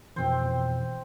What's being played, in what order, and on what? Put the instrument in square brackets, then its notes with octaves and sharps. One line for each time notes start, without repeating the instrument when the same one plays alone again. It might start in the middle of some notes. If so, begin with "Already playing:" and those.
[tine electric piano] F2 B2 E3 [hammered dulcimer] C4 C5